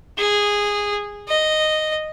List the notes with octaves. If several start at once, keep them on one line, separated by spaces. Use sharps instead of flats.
G#4
D#5